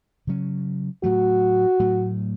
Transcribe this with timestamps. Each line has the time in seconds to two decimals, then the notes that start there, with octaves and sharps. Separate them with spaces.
0.27 C#3 F#3 C#4
1.03 A2 F#3 A3 F#4
1.80 A2 F#3 A3